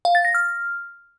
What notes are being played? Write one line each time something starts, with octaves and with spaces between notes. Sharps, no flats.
F5
A6
A#6
F6